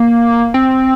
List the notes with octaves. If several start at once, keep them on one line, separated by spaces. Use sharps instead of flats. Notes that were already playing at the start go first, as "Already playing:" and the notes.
Already playing: A#3
C4